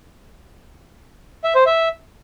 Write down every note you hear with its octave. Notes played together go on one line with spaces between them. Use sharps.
E5
C5
E5